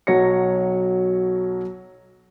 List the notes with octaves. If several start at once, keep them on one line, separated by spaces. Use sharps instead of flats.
B1 F#3 C#5 A#6 C#7